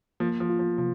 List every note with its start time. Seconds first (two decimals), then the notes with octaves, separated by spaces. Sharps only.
0.20 F3 A#3
0.40 F3
0.50 F4
0.59 F3
0.78 C3 F3